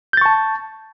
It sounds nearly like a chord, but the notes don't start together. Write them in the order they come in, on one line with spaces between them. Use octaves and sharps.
G6 A6 C#6 A5